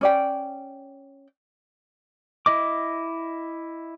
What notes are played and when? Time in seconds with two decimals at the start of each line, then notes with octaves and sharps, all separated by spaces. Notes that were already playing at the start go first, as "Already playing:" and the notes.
0.01 C#4 D5 G5
2.46 E4 D#5 D6